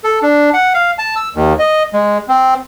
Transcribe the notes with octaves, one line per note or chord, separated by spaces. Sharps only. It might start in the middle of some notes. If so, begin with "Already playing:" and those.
A4
D4
F#5
F5
A5
E6
D#2
D#5
G#3
C4